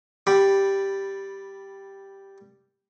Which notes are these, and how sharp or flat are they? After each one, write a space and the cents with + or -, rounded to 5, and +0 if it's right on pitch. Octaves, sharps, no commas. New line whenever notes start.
G3 +0 G4 +0 B5 +0